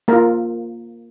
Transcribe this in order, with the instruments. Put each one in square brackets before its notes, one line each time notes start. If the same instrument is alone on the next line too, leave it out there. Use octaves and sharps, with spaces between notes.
[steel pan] A#3 F4 A#4